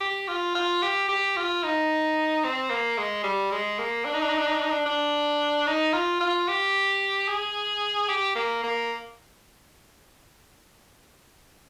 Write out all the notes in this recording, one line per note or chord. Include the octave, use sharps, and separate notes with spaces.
G4
F4
F4
G4
G4
F4
D#4
C4
A#3
G#3
G3
G#3
A#3
D4
D#4
D4
D#4
D4
D#4
D4
D#4
D4
D4
D#4
F4
F4
G4
G#4
G4
A#3
A#3